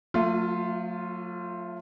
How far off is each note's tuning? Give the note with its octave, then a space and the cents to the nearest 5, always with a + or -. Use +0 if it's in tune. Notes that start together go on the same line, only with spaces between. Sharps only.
F#3 -40 A3 +25 F4 +0